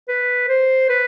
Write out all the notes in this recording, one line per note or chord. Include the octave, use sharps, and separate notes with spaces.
B4
C5
B4